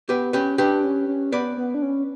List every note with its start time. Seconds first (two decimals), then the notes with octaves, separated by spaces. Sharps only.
0.09 B3 G4 B4
0.33 C#4 G4 B4
0.58 D4 G4 B4
0.84 C#4
1.08 C#4
1.32 B3 B4 D5
1.57 B3
1.74 D4
1.82 C#4